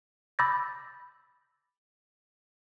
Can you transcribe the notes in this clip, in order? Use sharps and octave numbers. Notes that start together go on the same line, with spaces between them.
B5 D6 E6 G6 A6 A#6